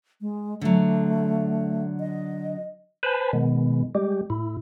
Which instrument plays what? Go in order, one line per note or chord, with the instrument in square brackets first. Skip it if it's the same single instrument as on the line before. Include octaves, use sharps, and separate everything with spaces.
[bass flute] G#3
[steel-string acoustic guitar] D3 F#3 [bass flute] A3
[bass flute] D#5
[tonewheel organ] B4 C5 G#5 A5 B5
B2 D#3 G#3 B3
G3 G#3 G4
A2 E4